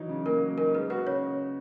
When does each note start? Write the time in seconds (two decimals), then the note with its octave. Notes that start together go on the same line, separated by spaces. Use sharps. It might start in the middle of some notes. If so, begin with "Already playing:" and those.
Already playing: E3 F#3 D#4
0.09 C#3
0.26 A#3 A#4
0.41 F#3
0.58 D#4 A#4
0.74 G#3 B4
0.90 F#4 B4
1.07 C#3 C#5